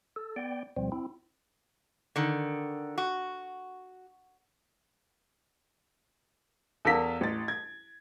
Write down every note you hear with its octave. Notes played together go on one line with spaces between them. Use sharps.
A4
B3 D5 G5
D2 B2 F3 G3 C4
C4 E4
D3 D#3
F#4
E2 A4 A#4 F5 B6
A1 A6
G#6